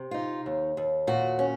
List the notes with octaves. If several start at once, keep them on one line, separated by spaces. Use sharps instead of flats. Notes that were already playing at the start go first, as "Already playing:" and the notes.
Already playing: C3
D#4 F4
D#2
D#2
A#2 F#4
C#4